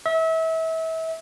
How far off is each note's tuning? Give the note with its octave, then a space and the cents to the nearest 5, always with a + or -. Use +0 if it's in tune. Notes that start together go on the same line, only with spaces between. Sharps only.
E5 -30